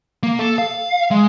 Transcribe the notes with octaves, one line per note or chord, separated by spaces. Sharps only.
A#3
A4
F5
G#3